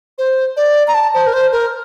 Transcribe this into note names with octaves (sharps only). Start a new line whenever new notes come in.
C5
D5
A#5
A5
C5
A#4
C5
A#4